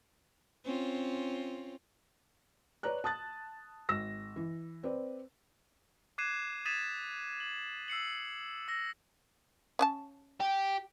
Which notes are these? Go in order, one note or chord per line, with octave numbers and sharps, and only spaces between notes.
C4 C#4 F4
B4 C#5 D5 A#5 F#6
A5 D#6 F#6 A6
G#1 E6 A#6
E3
C4 B4 D5
D6 F#6 G#6 C7 D#7 E7
D#6 G#6 A6 B6 D#7 E7
F#7
E6 C7 C#7 F#7
E6 A#6
C#4 D#5 A5
G4